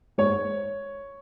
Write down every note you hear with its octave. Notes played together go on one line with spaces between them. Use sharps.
G#2 C#5